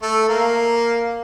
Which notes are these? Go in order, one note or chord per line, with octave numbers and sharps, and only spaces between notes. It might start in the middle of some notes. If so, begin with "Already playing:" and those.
A3 A4
A#3 A#4